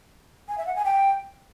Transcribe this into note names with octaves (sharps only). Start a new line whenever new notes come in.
G#5
E5
F#5
G#5
G5